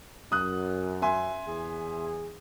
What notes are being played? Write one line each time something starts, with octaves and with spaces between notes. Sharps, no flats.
F#2 D#6 F#6
E5 G#5 C6
E2 G#4